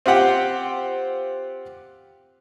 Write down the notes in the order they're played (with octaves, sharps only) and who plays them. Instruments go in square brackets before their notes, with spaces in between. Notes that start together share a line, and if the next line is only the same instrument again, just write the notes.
[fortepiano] C4 F4 G4 F#5 G5